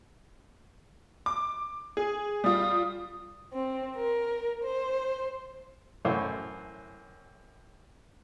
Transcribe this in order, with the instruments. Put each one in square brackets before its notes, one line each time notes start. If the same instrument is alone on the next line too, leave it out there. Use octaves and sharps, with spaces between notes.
[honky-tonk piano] D6
G#4
[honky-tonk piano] G3 F4 [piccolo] D#6
[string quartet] C4
A#4
C5
[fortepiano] F#2 A2 E3 A4 C5 C#5